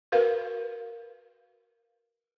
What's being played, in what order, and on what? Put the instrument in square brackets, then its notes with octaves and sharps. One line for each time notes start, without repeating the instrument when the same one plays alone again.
[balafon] F#4 A#4 B4 F5